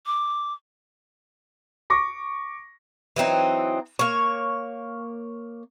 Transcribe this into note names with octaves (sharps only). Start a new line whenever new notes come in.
D6
C#6 D6 A#6
E3 F#3 C4 D#4
A#3 C#5